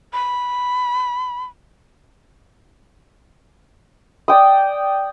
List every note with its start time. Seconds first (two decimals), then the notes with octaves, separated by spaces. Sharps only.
0.13 B5
4.28 D5 G5 D#6